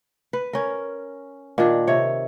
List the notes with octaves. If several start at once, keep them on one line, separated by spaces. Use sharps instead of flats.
B4
C#4 A#4
A#2 D#3 D4
C3 C#5